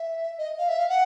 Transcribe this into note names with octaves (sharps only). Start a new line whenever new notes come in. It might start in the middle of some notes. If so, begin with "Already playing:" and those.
Already playing: E5
D#5
F5
E5
F5
F#5